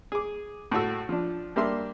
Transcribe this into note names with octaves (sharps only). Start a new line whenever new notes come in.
G#4 D6
A2 A3 F#4 E6
F3 D4
G3 A#3 D4 E5 C6